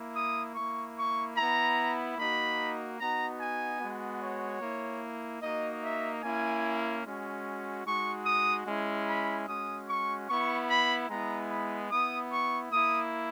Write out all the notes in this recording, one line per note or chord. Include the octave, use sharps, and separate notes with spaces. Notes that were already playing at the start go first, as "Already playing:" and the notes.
Already playing: A#3 E4
D#6
A#3 E4 C#6
C#6
B3 E4 A#5
A#3 D#4 F#4 B5
B3 D#4 F#4 A#5
G#5
G#3 B3 F#4
C#5
A#3 E4
A#3 D#4 F#4 D#5
E5
A#3 C#4 E4 G#5
G#3 C#4 F#4
G#3 D#4 F#4 C#6
D#6
G#3 C#4 E4
B5
G#3 C#4 F#4 D#6
C#6
B3 E4 C#6
B5
G#3 B3 E4 A#5
B5
B3 E4 D#6
C#6
A#3 E4 D#6